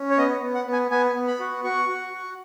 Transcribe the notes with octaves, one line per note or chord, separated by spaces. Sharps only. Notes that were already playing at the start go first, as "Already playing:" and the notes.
Already playing: C#4
C#5
B3 D#5
B3
F#5
B3
G#5
B3 G#5
B3
B5
F#4
F#4 C#6
F#4
F#4